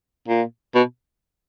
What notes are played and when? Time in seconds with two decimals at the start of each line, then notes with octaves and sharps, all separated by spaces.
0.28 A#2
0.75 B2